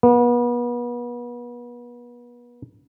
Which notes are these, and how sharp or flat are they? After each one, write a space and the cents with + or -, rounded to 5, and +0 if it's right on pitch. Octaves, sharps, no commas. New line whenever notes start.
B3 -35